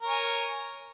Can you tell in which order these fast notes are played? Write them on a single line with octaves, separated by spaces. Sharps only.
A#4 C#5 G#5